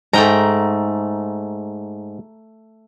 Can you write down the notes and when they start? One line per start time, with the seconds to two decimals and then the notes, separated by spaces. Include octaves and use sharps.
0.13 G#2 A3 G5 A#5